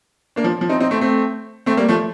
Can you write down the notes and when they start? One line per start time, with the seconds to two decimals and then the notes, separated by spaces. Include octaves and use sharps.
0.36 A#3 D4
0.44 F3
0.61 F3
0.69 C4 D#4
0.80 C4 D#4
0.91 A3 C4
1.01 A3 C4
1.66 A3 C4
1.77 G3 A#3
1.88 F3 A3